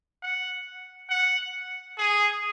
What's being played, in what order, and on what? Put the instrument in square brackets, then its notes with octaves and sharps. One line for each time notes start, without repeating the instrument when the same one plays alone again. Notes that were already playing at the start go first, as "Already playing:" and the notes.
[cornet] F#5
F#5
G#4